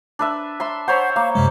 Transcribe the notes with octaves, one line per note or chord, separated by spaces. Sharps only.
D4 B4 E5
E5 B5 C6
C5 C#5 F#5 B5
A#3 F5
F#2 C3 G#3